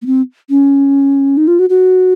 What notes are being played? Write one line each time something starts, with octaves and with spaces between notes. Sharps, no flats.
A#3
C4
C#4
D#4
F4
F#4
F#4